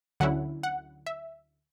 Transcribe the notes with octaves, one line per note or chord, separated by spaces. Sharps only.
D2 D3 F#3 C#4 E4 F#5
F#5
E5